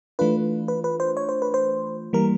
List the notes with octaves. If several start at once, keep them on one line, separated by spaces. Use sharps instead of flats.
E3 A3 D4 F4 B4
B4
B4
C5
C#5
C5
B4
C5
E3 G3 A#3 A#4